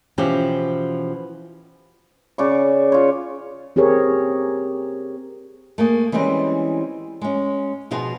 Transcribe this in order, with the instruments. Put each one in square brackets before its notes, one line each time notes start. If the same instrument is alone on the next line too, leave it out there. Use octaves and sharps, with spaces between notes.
[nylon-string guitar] B2 E3 F3 C#4 G4
[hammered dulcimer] C#3 D5 C#6
F4 C#5
[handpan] C4 G4 G#4 A#4 C#5
[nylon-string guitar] A3 A#3 G#4
E3 G3 G#3 C4 C#4
G#3 C#4
B2 F3 F4 F#4 G#4